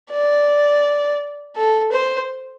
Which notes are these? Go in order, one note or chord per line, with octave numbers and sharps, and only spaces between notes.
D5
A4
C5